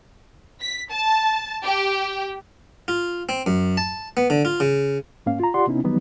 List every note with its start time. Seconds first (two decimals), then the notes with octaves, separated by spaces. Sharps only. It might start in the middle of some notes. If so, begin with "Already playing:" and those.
0.61 B6
0.91 A5
1.64 G4
2.88 F4
3.29 C4
3.46 F#2
3.77 A5
4.17 B3
4.30 D3
4.45 F4
4.60 C#3
5.26 G#2 A#3 C#4 F5
5.40 F4 A#5
5.54 F4 G4 D5 F#5 C6
5.67 C3 B3 C#4 D#4 E4
5.84 D#3 E3 F#3 G3 B3 D#4